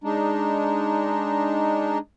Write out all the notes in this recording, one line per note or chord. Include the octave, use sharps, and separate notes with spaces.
G#3 D4 D#4